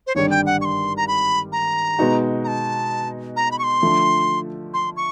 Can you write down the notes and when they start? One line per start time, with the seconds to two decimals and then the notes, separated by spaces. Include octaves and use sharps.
0.07 C5
0.15 G#1 G2 D3 G3 C#5
0.30 G5
0.46 F#5
0.61 C#6
0.65 C6
0.97 A#5
1.08 B5
1.52 A#5
1.99 B2 G#3 B3 D#4 F#4
2.44 A#5
2.47 A5
3.36 A#5
3.51 B5
3.59 C#6
3.64 C6
3.82 D3 F3 A3
4.74 C6
4.97 C#6